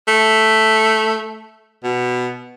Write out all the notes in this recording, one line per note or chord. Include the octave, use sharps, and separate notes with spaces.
A3
B2